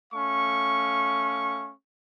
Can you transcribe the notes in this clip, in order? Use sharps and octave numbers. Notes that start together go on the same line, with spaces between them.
A3 C#4 F5 C#6